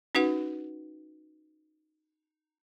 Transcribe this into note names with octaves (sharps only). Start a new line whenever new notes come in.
C#4 D#4 F#4 B4 F#5